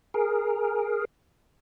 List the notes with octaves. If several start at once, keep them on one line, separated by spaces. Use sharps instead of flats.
G#4 A#4